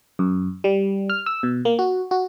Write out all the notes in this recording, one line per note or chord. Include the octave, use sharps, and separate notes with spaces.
F#2
G3
F6
E6
B2
A#3
F#4
F#4